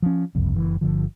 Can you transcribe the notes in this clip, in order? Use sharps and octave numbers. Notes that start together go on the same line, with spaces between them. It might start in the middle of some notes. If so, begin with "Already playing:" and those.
F3 C#4
F#1 C2 F2
F#1 E3
G1 D3 F3